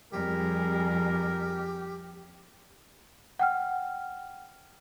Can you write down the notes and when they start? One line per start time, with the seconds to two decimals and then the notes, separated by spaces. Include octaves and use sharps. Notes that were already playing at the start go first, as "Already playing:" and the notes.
0.13 F2 G3 G4 G#4 A#4
3.39 F#5 G5 F6